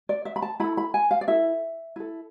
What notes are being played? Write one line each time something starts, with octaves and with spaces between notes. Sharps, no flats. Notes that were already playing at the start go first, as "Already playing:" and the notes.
D5
E5
B5
A5
E4 A4 B5
B5
G#5
F5
D5
E4 A4 E5
E4 A4